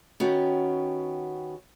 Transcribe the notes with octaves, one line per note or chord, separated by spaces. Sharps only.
D#3 B3 C#4 F#4 G4